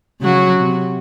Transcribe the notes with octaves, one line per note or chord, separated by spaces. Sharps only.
C#3 F#3 F#4
C3